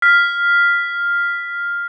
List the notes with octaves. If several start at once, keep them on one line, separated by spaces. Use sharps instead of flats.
F6 B6